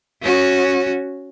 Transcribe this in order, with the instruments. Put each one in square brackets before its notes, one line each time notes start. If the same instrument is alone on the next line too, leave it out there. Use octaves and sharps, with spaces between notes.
[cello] C#4 F#4